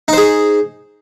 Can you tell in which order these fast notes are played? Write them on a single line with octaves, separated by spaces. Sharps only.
D#4 C5 G#4